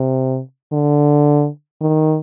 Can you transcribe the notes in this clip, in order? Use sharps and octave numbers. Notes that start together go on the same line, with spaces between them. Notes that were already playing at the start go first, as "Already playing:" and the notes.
Already playing: C3
D3
D#3